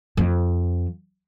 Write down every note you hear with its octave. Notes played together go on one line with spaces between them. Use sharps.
F2 F3